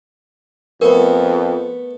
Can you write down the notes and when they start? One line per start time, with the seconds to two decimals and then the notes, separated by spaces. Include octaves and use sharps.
0.81 F2 A3 B3 A#4